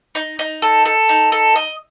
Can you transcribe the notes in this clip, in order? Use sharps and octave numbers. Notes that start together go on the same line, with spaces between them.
D#4
D#4
A4
A4
D#4
A4
D#5